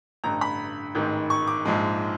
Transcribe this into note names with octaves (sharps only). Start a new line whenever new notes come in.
A1 G2 D3 A#5
B5
A1 G#2 D#3
C#6
D6
A#1 G#2 F3 G#3